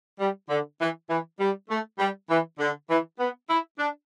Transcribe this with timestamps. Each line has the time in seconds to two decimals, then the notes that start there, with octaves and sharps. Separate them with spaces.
0.20 G3
0.50 D3
0.80 E3
1.09 E3
1.40 G3
1.69 A3
1.99 G3
2.30 E3
2.59 D3
2.89 E3
3.20 B3
3.49 E4
3.78 D4